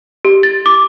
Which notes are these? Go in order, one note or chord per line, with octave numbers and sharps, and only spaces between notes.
G4
A6
D6